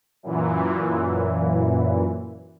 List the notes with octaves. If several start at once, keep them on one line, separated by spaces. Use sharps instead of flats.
F#2 A#2 E3